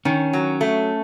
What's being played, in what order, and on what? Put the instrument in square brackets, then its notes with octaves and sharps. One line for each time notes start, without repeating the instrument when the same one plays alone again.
[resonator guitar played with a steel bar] D#3 [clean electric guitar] C#4
[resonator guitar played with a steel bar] F#3
A3